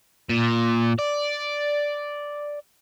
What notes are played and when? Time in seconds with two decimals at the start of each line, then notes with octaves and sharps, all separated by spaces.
0.29 A#2
0.99 D5